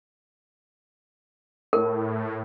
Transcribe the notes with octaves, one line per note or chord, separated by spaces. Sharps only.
A2 A#4